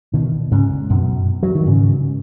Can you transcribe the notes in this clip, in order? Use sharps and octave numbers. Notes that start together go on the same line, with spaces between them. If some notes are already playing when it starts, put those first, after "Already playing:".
B2 D#3
G#2 C#3
F#2 B2
F#3
D#3
G#2 C#3